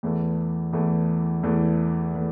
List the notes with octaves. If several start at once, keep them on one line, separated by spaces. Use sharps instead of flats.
E2 E3 A3
E2 E3 A3
E2 E3 A3
E3 A3